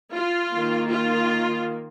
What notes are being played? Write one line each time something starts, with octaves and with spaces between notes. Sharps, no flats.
F4
D#3 A#3
F4